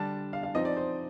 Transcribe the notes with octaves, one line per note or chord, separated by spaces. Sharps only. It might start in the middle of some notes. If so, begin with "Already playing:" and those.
Already playing: D3 G3 D4 A5
F5
F5
F3 C4 D#4 D#5
D5
C5